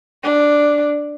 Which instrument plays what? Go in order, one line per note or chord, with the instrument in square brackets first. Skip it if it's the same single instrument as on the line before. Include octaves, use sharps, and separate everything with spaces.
[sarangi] D4